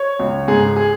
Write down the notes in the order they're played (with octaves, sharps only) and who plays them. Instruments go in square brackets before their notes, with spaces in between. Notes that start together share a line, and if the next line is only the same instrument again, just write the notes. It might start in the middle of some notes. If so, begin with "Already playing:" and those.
Already playing: [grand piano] C#5
C#2
G#2 G#4
G#4